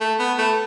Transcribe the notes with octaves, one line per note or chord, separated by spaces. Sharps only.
A3
B3
A3